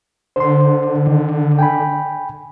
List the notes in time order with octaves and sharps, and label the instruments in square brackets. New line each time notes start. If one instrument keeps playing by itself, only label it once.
[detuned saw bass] D3 [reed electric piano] C5 C6
[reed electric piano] D#3
G5 G#5 B5